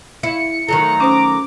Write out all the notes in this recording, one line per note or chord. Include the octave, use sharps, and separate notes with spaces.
E4 C#7
D#3 F#3 A3 A#5
C#4 C5 D6 D#6